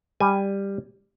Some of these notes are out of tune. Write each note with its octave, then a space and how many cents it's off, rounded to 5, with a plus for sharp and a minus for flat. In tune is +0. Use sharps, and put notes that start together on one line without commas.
G3 +10 G#5 +0